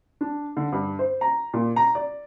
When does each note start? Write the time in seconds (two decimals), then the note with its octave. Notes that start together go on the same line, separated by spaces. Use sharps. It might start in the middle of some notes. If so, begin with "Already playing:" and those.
0.21 D4
0.57 D3
0.72 G2
0.99 C5
1.21 A#5
1.54 A#2
1.76 A#5
1.95 D5